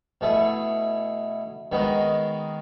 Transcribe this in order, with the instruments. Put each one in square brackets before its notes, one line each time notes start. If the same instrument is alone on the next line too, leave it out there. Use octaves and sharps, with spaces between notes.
[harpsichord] B2 A3 E4 G#4
D#3 G#3 B3 D#4 F#4